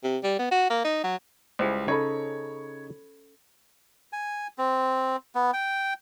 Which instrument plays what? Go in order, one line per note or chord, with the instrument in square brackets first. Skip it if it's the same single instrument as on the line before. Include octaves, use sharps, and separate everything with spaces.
[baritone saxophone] C3
G3
B3
F#4
A#3
D#4
F#3
[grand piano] C#2 [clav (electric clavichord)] G3 E4 G#5 [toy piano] G#4 C5
[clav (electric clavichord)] C#3 D#4 [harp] C#4 A4 B5 [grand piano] C#5
[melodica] G#5
C4
B3
G5